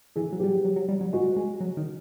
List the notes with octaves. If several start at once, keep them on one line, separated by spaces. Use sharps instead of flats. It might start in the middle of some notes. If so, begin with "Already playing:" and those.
E3 G#4
F#3
G3 G4
F#3
F#3
F#3
G3
F#3
G#3 F#4
G#3
F#3
D#3